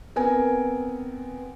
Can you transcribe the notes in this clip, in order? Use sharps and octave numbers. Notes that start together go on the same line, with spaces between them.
B3 C4 A#4 G#5